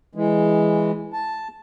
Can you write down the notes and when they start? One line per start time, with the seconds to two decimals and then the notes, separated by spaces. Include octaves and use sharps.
0.15 E3 G#3
1.13 A5